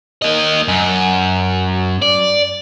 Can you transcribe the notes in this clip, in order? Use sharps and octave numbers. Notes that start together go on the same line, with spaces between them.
A#3 D#5
F#2
D5